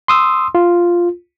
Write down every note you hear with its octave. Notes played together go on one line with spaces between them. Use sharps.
C6 D#6 E6
F4